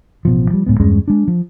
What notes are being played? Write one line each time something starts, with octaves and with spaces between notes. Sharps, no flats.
A1 B2 F3
F3 G3
D1 A2 G#3 B3
E2 G2 G#3 C#4
G#3 D4
F3